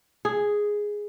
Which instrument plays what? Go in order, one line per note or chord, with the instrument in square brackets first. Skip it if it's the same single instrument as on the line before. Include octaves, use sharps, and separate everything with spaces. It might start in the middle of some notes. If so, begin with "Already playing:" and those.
[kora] G#4